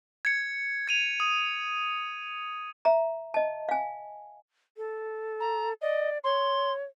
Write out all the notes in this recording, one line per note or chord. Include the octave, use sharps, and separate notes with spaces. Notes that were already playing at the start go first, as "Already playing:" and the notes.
G#6 C#7
G#6 D#7 F7
D#6
E5 A#5
D#5 A5
F5 G#5
A4
A#5
D5 D#5
C#5 C6